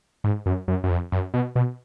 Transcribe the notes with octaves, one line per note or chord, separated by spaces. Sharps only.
G#2
F#2
F#2
F#2
F2
F#2
B2
B2